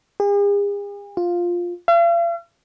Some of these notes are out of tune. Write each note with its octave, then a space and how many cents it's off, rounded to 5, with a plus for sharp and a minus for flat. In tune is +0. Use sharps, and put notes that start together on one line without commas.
G#4 -45
F4 +5
F5 -45